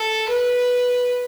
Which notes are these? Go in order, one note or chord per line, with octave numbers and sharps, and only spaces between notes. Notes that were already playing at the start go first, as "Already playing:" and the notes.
Already playing: A4
B4